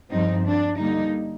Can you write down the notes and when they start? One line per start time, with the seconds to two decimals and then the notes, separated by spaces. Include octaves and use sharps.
0.12 G2 F3 C4 D#4
0.46 D4
0.79 D3 G3 A#3 D#4